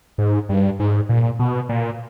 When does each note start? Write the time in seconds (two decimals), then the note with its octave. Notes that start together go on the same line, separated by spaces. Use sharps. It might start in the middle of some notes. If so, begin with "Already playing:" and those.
0.18 G#2
0.49 G2
0.80 G#2
1.09 A#2
1.39 B2
1.69 A#2